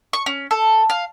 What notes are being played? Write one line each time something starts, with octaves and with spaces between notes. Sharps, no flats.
C#6
C#4
A4
F5